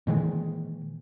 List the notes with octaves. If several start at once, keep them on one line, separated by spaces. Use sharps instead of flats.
A#2 D#3 E3 G#3